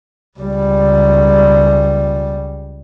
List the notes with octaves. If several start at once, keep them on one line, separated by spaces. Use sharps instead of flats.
C#2 G3